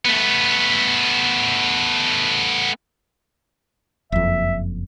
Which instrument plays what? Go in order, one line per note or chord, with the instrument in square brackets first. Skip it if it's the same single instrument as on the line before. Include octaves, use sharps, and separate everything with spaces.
[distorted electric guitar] A3 B3
[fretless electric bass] F#1 F2 [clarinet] E5